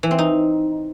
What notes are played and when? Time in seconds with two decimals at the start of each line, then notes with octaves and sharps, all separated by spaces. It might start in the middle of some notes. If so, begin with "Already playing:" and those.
0.03 E3
0.11 C4
0.19 D#4